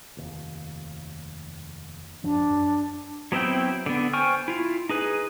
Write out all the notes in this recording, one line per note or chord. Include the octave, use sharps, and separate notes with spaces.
F1 D#2
A1 F#2 F3 D4
F#2
F#3 B3 C4 E4 G5
D3 B3
C5 G5 G#5 C#6 F6
E4 F4
D#4 G#4 B4